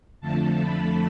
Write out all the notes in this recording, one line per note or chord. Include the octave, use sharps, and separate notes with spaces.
F2 D3 F3 A3 A5
B5